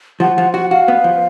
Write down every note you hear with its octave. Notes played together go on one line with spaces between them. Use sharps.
F3 F#5
F3 F#5
F#4 F#5
F#4 F5
B3
F3